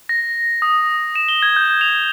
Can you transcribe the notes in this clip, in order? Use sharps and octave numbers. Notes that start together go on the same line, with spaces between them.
A#6
D#6
E7
G7
G#6
G6
F7